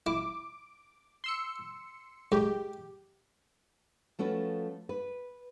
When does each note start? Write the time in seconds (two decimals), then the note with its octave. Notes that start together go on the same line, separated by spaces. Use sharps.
0.07 E4 D6
1.24 C6 E6 C#7
2.32 G#2 G4
4.19 F3 A3 C#4 F#4 B4
4.89 B4